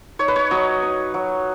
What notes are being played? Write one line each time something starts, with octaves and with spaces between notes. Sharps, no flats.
D#4 C#5
B4
C#5
F#3 D#5
D#4
F#3